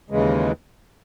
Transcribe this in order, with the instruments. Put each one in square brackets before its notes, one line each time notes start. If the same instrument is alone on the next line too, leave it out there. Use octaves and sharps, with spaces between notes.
[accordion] D#2 C#3 E3 G#3